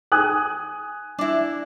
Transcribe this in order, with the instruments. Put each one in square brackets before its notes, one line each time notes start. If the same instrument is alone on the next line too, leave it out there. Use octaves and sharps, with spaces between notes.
[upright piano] G#5 D#6 F#6
[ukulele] D4 E4